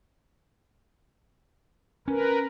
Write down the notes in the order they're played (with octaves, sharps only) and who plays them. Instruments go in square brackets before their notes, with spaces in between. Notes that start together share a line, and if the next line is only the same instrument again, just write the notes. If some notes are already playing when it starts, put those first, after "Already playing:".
[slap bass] C#4 [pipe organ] A#4 B4